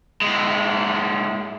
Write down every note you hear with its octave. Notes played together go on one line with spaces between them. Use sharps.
A2 G#3